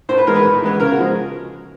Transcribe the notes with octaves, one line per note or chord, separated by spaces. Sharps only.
A2 C5
B4
E3 G#3 B3 A#4
B4
A2
E3 G#3 B3
C#3 A#4
F#4
F3 G#3